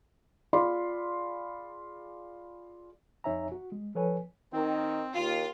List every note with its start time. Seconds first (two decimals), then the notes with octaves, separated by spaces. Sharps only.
0.53 F4 G#4 D5 F5 B5 C6
3.24 F2 D#4 C#5 E5 G#5 A#5
3.52 F#4
3.72 G#3
3.95 F3 A4 B4 C#5 G#5
4.53 D#3 C4 D#4
5.15 D#2 F4